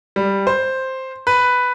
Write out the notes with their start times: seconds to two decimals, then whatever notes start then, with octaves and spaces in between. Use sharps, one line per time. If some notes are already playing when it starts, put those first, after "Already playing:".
0.16 G3
0.47 C5
1.27 B4